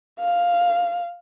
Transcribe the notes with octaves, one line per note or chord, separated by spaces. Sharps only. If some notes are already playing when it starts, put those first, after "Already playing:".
F5